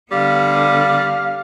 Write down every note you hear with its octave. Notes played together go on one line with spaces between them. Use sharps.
D3 G3 B3 F5